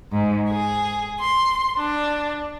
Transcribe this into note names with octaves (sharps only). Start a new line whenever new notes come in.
G#2
G#4
C6
D4